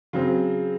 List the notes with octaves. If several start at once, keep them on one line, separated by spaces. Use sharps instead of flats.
C#3 F#3 C4